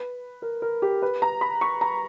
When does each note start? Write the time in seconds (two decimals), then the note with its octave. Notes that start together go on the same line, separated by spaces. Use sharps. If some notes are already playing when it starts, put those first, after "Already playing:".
Already playing: B4
0.42 A#4
0.62 A#4
0.82 G4
1.02 B4
1.22 A#5
1.41 B5
1.61 C#6
1.81 A#5